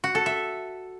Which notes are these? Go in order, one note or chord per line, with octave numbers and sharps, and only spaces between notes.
F#4
A4
E5